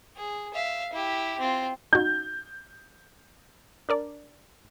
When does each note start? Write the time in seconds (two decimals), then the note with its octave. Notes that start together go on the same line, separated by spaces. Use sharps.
0.16 G#4
0.54 E5 F5
0.93 E4 G4
1.39 C4 F4
1.93 D#4 F#4 G6
3.89 D4 A#4 D5